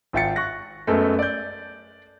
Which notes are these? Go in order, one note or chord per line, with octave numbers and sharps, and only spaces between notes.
G#1 F4 E5 G5 A6 C#7
C#6 F#6 A#6
F#2 G#3 A3 B3 A4 A#4
D5 G6